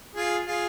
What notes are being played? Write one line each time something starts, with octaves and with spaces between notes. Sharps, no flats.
F4 G#4
F4 G#4